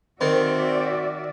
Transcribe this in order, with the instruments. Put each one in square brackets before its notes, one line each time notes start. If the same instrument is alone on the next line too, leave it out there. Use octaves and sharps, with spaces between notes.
[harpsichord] D#3 [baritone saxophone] C4 [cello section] F#4 D5 E5